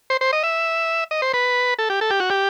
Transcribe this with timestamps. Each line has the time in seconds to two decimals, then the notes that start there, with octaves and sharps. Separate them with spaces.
0.10 C5
0.21 C5
0.33 D#5
0.43 E5
1.11 D#5
1.22 C5
1.34 B4
1.79 A4
1.90 G4
2.01 A4
2.10 G4
2.20 F#4
2.30 G4